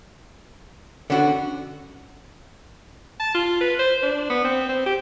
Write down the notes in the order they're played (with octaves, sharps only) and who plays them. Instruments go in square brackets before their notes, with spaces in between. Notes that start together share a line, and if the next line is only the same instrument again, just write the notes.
[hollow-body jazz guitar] D3 C#4 [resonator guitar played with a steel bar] B3 F#4
[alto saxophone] A5
F4
B4
C5
D4
B3
C4
C4
G4